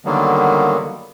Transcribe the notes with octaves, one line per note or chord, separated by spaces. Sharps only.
D3 D#3 F#3 G3 A#3 B3